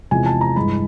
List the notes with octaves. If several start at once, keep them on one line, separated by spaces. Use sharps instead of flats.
E2 C3 F3 G#3 G#5
A5
A#5
G2 E3 G#3 B5